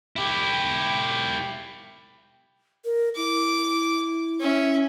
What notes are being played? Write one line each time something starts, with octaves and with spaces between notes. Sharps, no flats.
E4 G4
A#4
E4 D6
C#4 E5